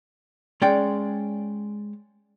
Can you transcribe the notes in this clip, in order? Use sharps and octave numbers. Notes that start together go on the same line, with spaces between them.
G#3 C#4 D5 G5